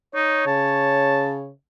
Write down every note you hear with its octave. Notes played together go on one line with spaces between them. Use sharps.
D#4 C#5
C#3 A5